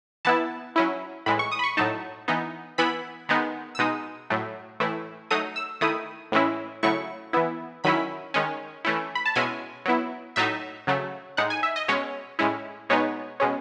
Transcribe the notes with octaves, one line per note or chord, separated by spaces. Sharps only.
E3 B3 E4 A5
F#3 C#4 E4
A2 E3 G#3 B5
C#6
D#6
B5
C#6
A2 F#3 A3 D#4 A5
E3 B3 D#4
E3 B3 E4 B5
D#3 G#3 B3 D#4
E6
B2 G#3 D#4 D#6
A2 F#3 A3
A2 E3 A3 E4
F#3 A3 D#4 D#6
E6
D#3 A3 E4 D#6
A2 E3 G#3 C#4 E4
C#3 F#3 A3 E4 C#6
E3 B3 E4
D#3 F#3 C#4 E4 B5
D#3 G#3 C#4
E3 A3 C#4 E4
B5
A5
B2 G#3 C#4 E4 G#5
F#3 B3 E4
A2 F#3 A3 D#4 E5
C#3 F#3 A3
A2 G#3 D#4 F#5
G#5
E5
D#5
B2 G#3 C#4 C#5
A2 G#3 C#4 E4
B2 G#3 B3 D#4 C#5
B2 G#3 C#4